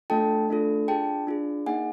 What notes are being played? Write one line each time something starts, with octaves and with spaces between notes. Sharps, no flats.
A3 D4 F4 A4 G5 A5
A3 D4 F4 A4
D4 F4 G#4 G5 A5
D4 F4 G#4
A#3 D#4 G#4 F#5 G#5